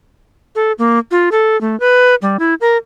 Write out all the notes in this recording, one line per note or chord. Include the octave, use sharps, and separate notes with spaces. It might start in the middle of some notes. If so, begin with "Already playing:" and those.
A4
A#3
F4
A4
A3
B4
G3
E4
A#4